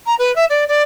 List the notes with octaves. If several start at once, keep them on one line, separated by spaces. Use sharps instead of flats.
A#5
B4
E5
D5
D5